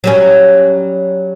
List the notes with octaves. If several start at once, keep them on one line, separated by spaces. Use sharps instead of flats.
F#3 G3 C#4